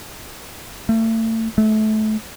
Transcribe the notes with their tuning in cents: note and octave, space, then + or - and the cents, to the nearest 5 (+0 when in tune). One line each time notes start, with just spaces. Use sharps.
A3 +35
A3 -25